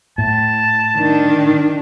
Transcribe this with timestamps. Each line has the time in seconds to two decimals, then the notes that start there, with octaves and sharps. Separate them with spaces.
0.18 A2 A5
0.97 D#3 D4